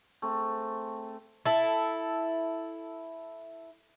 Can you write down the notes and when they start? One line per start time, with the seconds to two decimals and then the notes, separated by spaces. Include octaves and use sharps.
0.22 A3 C4 G#4
1.46 E4 A4